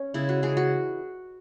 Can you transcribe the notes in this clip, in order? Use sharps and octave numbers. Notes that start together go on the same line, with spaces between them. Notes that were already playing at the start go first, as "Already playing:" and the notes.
Already playing: C#4
C#3 G#3 E4
F#4
C#3 E3 G#3 G#4
F#4